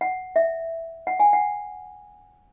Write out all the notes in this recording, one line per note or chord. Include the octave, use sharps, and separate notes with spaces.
F#5
E5
F#5
G#5
F#5